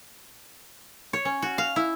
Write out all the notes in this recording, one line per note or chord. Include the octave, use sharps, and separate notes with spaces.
C#5
C#4
F#4
F5
E4